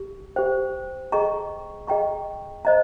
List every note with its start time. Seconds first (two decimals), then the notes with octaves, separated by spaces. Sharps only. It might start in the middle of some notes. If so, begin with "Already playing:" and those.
Already playing: G4
0.36 G4 C5 G5
1.12 G#4 D#5 G5 A#5 C#6
1.87 G#4 D#5 G5 A#5 C#6
2.65 C5 D#5 A#5